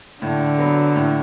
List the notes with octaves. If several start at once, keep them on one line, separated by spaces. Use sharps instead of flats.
A2 D3
F#3 B3
A2